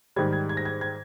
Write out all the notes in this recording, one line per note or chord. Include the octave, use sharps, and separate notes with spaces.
G#2 D#3 G3 G#6
G#6
G#6
A#6
G#6
G#6